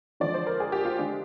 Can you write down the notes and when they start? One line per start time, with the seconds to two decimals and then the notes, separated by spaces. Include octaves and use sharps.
0.20 D3 F3 G#3 D5
0.34 C5
0.47 A#4
0.60 G#4
0.72 G4
0.85 F4
0.98 D3 G#3 D4